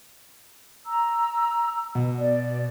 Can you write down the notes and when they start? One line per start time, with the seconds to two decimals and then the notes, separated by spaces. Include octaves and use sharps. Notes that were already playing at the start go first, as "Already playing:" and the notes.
0.86 A#5 E6
1.95 B2
2.19 D5